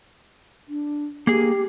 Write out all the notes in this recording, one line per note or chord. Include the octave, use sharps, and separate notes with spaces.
D4
A#3 G4 G#4